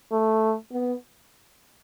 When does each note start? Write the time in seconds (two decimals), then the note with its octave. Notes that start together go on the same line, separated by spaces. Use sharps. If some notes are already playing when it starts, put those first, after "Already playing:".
0.11 A3
0.72 B3